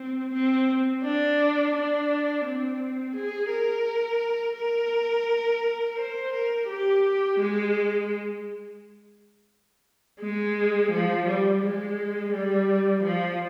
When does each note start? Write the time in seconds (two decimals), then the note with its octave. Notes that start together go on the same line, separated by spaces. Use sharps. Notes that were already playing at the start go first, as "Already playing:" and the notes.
Already playing: C4
0.33 C4
1.04 D4
1.75 D4
2.45 C4
3.15 G#4
3.50 A#4
4.57 A#4
5.98 C5
6.33 A#4
6.68 G4
7.39 G#3
10.21 G#3
10.92 F3
11.27 G3
11.62 G#3
12.33 G3
13.03 F3